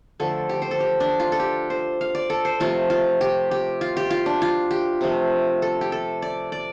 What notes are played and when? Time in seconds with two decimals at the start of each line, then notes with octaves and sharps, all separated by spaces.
0.20 D3 F3 A3 A4
0.49 G4
0.62 C5
0.71 A4
0.80 G4
1.00 D4
1.20 F4
1.32 A4
1.40 G4
1.70 C5
2.01 F5
2.15 D5
2.30 A4
2.45 C5
2.60 C3 F3 A3 F4
2.90 F4
3.21 G4
3.51 G4
3.81 F4
3.97 G4
4.11 F4
4.26 D4
4.42 F4
4.71 G4
5.01 C3 F3 A3
5.62 A4
5.81 G4
5.92 A4
6.22 D5
6.52 D5